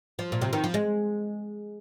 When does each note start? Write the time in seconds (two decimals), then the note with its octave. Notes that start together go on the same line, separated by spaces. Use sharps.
0.19 F3
0.32 A#2
0.42 C3
0.53 D#3
0.64 F3
0.74 G#3